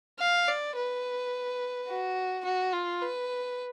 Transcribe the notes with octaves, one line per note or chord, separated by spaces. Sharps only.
F5
D5
B4
F#4
F#4
F4
B4